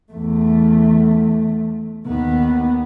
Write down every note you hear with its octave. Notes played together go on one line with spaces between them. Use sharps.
E2 A3
D#2 B3